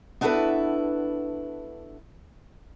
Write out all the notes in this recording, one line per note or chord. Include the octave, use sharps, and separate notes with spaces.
B3 D4 E4 F#4 A4 B4